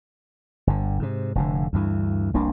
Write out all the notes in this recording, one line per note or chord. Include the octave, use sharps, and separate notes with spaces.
G1 D3
G#2 C3
F1 A2 D3
D2 G2 E3
F1 C2 A#3 D4